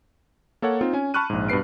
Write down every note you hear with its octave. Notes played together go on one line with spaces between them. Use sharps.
A#3 A4 C#5 F#5
C4 D#4 F4
C#4 G#5
A5 B5 C#6 F6 F#6 D#7
A#1 G#2
G2 B2 B4 C7 D7